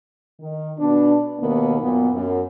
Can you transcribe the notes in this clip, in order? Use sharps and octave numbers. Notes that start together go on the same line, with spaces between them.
D#3
B2 B3 D4
D#2 B2 D#3 A#3 B3
F#2 A#2 B3
F#2